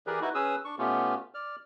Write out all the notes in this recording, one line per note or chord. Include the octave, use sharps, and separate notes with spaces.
E3 G4 G#4 A#4 B4 D5
D#4 E4 F#4 B4
C#4 G#4 B4 D#6 E6
D4 C#6
B2 A3 B3 C#4 F4 G4
D5 F6